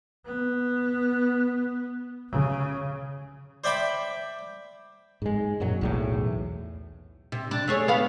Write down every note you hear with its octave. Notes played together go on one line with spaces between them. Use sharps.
B3
C#3
C5 D5 E5 G5 B5 D6
G#2 G#3
F#2 A#2 F#3
B1 E2 A2
C3
D4
A3 G#4 C#5
B3 F5